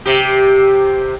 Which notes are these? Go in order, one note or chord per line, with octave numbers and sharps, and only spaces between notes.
C3 G4